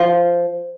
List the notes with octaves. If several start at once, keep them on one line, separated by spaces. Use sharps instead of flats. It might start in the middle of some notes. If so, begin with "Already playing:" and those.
Already playing: F3